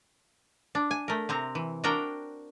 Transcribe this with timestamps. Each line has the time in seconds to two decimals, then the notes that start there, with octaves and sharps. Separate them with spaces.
0.75 D4
0.91 G#5
1.08 A3 A#4
1.29 C3 C4 A#5
1.55 E3
1.84 D4 F#4 A#4 G5 A#5